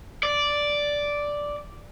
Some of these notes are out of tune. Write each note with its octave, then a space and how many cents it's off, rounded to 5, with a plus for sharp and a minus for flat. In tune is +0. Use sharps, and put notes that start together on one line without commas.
D5 -5